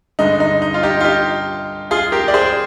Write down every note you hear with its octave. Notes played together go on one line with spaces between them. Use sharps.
G2 D3 G#3 D#4
D#4
D#4
F4
D#4 G4
F4
D#4 G4
F4 G#4
G4 A#4
D5
G#4 C5